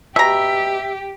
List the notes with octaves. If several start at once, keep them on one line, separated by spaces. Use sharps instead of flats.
B2 G4 E5 A#5